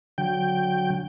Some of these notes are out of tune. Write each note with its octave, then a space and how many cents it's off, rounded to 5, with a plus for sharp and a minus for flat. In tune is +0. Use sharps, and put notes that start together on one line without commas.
D3 -15 F#3 -15 G5 +0